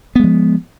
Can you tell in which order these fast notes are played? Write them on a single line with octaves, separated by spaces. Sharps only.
B3 G#3 F3